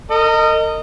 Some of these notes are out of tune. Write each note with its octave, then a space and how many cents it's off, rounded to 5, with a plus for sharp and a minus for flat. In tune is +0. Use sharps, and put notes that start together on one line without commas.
A#4 -35 D#5 -10